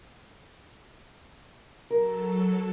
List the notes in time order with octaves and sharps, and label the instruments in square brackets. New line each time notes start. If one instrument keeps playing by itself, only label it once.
[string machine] F#3 A4 [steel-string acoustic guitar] A#4